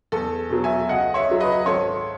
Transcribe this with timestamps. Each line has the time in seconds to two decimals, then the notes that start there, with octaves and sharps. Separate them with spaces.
0.12 E2 A4
0.50 B2 F#3
0.64 E5 G#5
0.89 C#2 D#5 F#5
1.14 C#5 E5
1.28 C#3 F#3
1.40 B4 D#5
1.66 G#1 A4 C#5